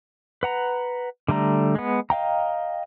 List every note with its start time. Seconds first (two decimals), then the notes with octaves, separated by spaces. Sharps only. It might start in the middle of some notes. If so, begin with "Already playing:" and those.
0.43 B4 F#5 A#5
1.28 D3 G3 A3 A#5
1.75 G#3 B3
2.10 D#5 F5 G5 A#5